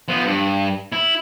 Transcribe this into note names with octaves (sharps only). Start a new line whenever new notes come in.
F3 B3
G2
E4